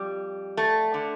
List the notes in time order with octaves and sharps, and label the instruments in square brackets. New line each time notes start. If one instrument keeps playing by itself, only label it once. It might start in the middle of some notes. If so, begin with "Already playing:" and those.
Already playing: [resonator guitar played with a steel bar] F2 G3
A3
D3